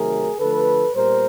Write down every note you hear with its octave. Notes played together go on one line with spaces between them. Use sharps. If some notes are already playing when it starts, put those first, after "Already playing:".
Already playing: C3 D#3 F#3 A3 G#4 A#4
D3 F3 A3 A4 B4
A#2 G3 B3 A#4 C5